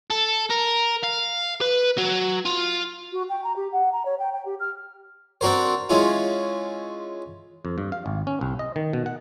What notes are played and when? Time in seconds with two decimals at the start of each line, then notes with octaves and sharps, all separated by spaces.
0.11 A4
0.50 A#4
1.03 F5
1.61 B4
1.97 F#3
2.46 F4
3.12 F#4
3.29 G5
3.44 A#5
3.56 G4
3.72 F#5
3.92 A#5
4.05 C#5
4.19 G5
4.33 G5
4.45 G4
4.60 F6
5.41 C4 D4 F#4 A#4 C5
5.89 G#3 C#4 E4 F4
7.65 F2
7.78 G2
7.92 F5
8.06 G#1
8.27 C#4
8.41 C2
8.59 D#5
8.76 D#3
8.93 B2
9.06 F#5